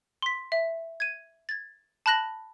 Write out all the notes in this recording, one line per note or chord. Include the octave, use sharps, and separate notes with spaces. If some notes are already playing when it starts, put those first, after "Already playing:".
C6 B6
E5
G#6 D#7
G#6 A6
A5 B5 F#6 A#6 F#7